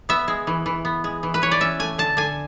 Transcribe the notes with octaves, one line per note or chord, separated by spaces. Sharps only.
B3 E5
G#3
E3
E3
B3
G#3
E3
B4
E3 C#5
D5
C#4 E5
A3 G#5
D3 A5
D3 G#5